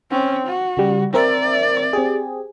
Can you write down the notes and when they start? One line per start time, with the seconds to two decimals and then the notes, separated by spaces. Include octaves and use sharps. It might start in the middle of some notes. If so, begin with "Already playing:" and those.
0.11 C4 C#4
0.47 F#4
0.77 C#3 G3
1.14 C4 A#4 D5 E5
1.93 C4 G4 G#4